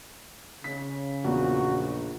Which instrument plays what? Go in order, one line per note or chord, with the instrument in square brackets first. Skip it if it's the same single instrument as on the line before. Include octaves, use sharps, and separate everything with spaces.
[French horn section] C#3 [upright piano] B6
[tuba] A#1 [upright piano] E2 A#2 [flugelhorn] F#4